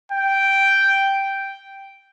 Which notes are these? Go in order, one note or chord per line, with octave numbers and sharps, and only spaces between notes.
G5